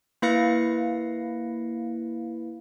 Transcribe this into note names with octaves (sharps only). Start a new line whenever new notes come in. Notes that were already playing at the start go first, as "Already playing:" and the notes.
A#3 E4 B4 F5 A#6 C#7